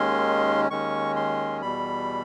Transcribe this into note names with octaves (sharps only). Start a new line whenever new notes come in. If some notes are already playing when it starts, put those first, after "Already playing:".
Already playing: D#2 D#3 G#3 C#4 C6
D#2 D#3 G#3 C#4 C#6
C6
E2 B2 G3 B5